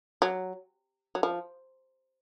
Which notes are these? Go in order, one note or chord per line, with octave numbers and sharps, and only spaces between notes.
F#3
F#3
F3